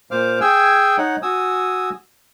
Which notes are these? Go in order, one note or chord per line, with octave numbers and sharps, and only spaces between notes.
A#2 C5 F5 D6 F6
G#4 G5 G#5 E6
D#4 C#5 F#5
F#4 G#5 D#6 E6